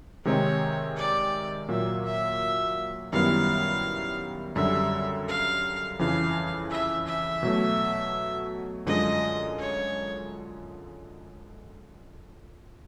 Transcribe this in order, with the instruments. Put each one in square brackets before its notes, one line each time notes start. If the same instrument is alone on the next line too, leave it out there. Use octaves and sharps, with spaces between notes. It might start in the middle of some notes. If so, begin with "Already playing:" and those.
[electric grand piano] C3 D#3 G#3 C4 D#4 [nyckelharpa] C#5
[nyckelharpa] D5
[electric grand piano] A#2 F#3 A#3 [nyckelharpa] E5
[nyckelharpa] E5
[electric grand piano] F#2 D#3 G3 B3 E4 [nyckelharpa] F5
[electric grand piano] F#2 D3 G3 [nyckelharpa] E5
[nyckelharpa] F5
[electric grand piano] F2 C#3 E3 [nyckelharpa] F5
[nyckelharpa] E5
E5
[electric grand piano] B2 F#3 A3
[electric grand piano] F#2 D3 F3 G#3 [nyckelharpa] D#5
[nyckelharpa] C#5